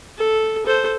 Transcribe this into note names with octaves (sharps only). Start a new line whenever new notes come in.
A4
A4 C5